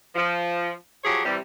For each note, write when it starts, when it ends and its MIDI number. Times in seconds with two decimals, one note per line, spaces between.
0.16 0.71 53
1.04 1.20 53
1.04 1.20 54
1.04 1.20 67
1.04 1.20 68
1.04 1.20 73
1.25 1.36 48
1.25 1.36 52
1.25 1.36 55